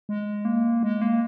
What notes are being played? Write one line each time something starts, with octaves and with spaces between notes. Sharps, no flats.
G#3
A#3
G#3
A#3